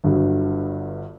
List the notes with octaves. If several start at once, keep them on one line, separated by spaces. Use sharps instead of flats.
G1 G2 D3 F#3